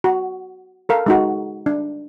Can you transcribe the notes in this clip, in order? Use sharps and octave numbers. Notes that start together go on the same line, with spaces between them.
F#4
A4 A#4 F5
G#3 D#4 F#4
D4